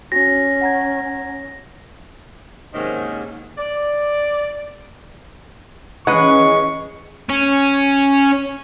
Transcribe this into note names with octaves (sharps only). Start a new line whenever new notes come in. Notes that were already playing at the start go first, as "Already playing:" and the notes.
C#4 F#4 A#6
F#5 A#5 G#6
G#2 C3 D#3 A#3 C#4
D5
E3 G#3 C#4 B4 F#5 C#6
C#4